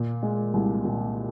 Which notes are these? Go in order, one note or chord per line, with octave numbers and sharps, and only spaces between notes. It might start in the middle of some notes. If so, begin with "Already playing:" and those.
Already playing: A#2
G#3
C2
A#2